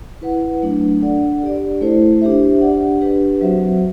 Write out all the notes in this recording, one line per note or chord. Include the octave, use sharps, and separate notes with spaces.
E4 B4 F#5
F#3 A3 D4
D4 A4 D5 F#5
D4 G4 D5
A3 E4 A4 C5
D4 G4 C5 E5
D4 G4 D5 F#5
D4 G4 B4
F#3 C4 F#4 C5 E5